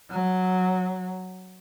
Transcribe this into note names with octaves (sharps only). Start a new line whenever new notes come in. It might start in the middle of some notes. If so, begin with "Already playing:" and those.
F#3